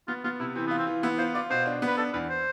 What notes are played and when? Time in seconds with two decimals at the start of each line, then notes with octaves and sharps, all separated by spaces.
0.08 B3 F4
0.24 B3 F4
0.40 C3 E4
0.55 E3 C4
0.67 B3 F4
0.78 C4
0.87 E3
1.03 B3 E4
1.19 F4 C5
1.34 F4 D5
1.50 B2 C5
1.66 D4
1.82 B3
1.87 B4
1.98 D4 A4
2.13 E2 B4
2.29 C5